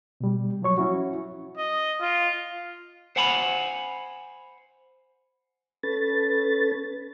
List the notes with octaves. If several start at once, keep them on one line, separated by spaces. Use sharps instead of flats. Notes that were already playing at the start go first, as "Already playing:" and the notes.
B2 G3
F3 F#3 C#5 C#6
C#4 E4 F#4
D#5
F4
C5 F#5 G#5 B5
C#4 A4 B4 A6